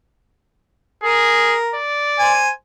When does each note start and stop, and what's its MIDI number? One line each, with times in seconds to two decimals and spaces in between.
1.04 1.57 68
1.04 1.76 70
1.75 2.44 74
2.19 2.50 72
2.19 2.50 80